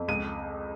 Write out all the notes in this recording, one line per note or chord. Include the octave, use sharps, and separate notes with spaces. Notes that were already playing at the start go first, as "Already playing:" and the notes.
Already playing: F2
C#2 D#7